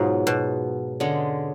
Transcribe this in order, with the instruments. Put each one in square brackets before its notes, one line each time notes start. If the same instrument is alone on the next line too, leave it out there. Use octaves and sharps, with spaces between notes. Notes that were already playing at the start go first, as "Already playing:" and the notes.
Already playing: [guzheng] G#2 B2 [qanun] F#3 B3 F4 G#4
[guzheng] B2
[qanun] D3 G#3 C#4